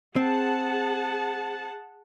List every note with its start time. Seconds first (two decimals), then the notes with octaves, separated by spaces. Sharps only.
0.16 C4 G#4 F#5 A5